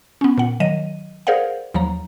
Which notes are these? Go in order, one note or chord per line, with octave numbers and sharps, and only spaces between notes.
B3 C#4
A#2 F#5
D#3 F#3 D#5 D#7
G#4 A#4 C5 D5 F5 F#5
D#2 F3 F#3 A#5